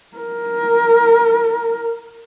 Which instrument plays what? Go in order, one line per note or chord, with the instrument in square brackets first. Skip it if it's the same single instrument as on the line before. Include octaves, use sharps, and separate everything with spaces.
[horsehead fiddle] A#4